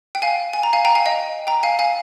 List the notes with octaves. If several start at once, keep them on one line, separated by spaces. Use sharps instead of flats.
G5
F5 G#5
G#5
A#5
F5 G#5
G5 A#5
F5 G#5
D#5 G5
G5 A#5
F5 G#5
F5 G#5